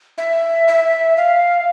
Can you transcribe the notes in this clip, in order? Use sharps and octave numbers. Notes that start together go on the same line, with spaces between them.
E5
E5
F5